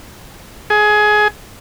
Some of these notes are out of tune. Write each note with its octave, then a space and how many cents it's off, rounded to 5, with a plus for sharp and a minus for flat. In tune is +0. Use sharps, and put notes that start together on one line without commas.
G#4 +20